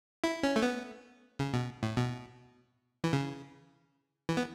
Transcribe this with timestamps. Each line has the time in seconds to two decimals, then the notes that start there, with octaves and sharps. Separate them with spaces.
0.24 E4
0.43 C#4
0.56 A3
0.62 B3
1.39 C#3
1.53 B2
1.83 A2
1.97 B2
3.04 E3
3.13 C#3
4.29 E3
4.37 B3